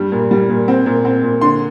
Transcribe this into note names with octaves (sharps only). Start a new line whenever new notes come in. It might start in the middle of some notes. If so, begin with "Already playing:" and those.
Already playing: G2 G3
A#2
G3
A#2
C4
A#2
C4
A#2
D3 C6